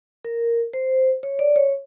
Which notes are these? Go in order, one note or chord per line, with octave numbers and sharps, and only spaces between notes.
A#4
C5
C#5
D5
C#5